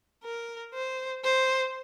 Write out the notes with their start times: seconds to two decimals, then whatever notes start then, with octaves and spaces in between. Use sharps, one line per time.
0.24 A#4
0.73 C5
1.24 C5